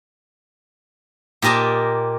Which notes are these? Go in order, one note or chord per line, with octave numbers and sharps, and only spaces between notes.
A#2 G4 A#4 D#5 A5